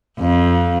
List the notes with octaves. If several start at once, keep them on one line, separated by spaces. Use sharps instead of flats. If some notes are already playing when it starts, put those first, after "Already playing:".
F2